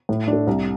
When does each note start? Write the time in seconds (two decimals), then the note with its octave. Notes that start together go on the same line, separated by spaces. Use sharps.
0.09 A2
0.28 A3 D4
0.47 C2